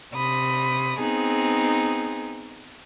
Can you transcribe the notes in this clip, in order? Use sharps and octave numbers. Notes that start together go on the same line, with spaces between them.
C3 B5 D#6
B3 C4 D#4 G#4